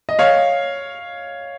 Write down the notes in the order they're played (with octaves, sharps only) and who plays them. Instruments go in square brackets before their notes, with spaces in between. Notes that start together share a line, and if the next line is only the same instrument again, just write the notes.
[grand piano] D#5
C#5 F5